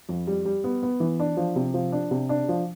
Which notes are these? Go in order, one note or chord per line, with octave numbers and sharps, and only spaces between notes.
F2
G3
G3
B3
B3
E3
D4
F3
C3
F3
D4
C3
D4
F3